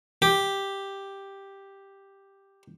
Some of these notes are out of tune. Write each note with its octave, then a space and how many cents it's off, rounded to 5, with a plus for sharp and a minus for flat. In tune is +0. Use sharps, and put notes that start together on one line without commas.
G4 +0